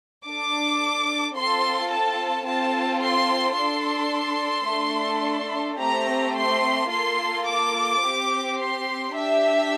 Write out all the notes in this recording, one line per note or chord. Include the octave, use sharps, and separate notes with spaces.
D4 A4 D6
C4 F4 A4 C6
A5
C4 F4 A4 A5
C6
D4 A4 C6
A3 D4 A4
A3 C4 G4 A#5
C6
A#3 F4 A4 C6
D6
C4 G4
C6
D4 G4 E5